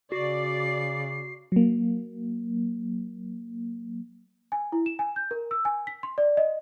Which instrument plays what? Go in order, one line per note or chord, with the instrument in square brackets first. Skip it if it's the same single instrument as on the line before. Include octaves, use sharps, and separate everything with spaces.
[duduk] C#3 [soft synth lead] F#4 [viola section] D5 [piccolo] C7
[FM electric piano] F#3 A#3
[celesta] G#5
E4
E7
G#5
G6
A#4
E6
G#5
B6
C6
D5
D#5